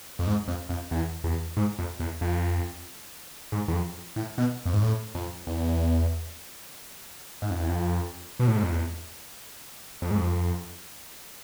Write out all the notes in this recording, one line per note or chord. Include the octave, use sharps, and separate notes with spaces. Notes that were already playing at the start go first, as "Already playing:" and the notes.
F2
G#2
F2
F2
E2
E2
G#2
F2
E2
F2
G#2
E2
F2
A2
B2
F2
G#2
A2
F2
E2
G#2
F2
E2
F2
B2
A2
G#2
F2
E2
F2
G#2
F2